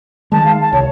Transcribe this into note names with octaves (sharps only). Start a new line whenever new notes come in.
D#3 G#3 A5
F5
A5
C2 C#5